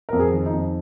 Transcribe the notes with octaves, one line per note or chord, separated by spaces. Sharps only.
F2 A#4
G#4
D#3
D#4
F2